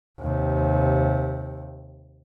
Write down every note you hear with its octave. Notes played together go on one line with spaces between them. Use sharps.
D#2 C3